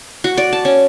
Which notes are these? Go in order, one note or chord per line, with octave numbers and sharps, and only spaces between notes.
F#4
D5
A5
C#4